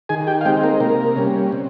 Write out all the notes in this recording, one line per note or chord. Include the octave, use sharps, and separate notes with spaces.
D#3 G#4 G#5
G4 G5
F5
G#3 C4 D#4 G4 G5
A#3 A#4
C3 A#3 A#4
G3 A#3 C#4
C3